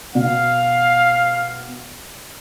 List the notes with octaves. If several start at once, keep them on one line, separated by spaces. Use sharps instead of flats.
B2 F5